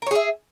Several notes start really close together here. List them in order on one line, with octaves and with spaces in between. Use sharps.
A#4 C#5 G#4 E5